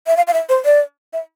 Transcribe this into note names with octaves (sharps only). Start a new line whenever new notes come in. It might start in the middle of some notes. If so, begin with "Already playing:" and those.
E5
F5
F5
E5
C5
D5
E5